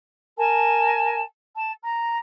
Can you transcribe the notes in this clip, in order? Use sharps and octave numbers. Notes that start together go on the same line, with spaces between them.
A#4 G#5 A5
A5
A#5